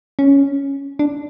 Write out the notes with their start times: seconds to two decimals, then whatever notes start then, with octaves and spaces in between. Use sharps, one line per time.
0.19 C#4
0.99 D4